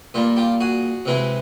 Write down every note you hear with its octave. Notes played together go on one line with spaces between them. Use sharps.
A#2 G3 A#3 F4
F4 G4
F#4 G#4
C3 E3 G#3 C4 E4